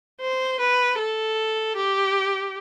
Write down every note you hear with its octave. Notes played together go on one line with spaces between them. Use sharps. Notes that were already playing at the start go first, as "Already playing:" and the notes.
C5
B4
A4
G4